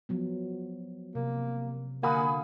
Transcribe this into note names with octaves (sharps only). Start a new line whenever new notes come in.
F3 F#3 B3
C3 A#3
D3 A#3 F5 F#5 G#5 B5 D#6